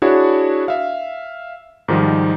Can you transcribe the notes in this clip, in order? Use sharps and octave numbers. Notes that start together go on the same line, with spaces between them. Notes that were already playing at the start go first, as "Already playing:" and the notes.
D4 E4 F#4 G#4 C#5
E5 F5
G#2 D#3 F3 G3 D#4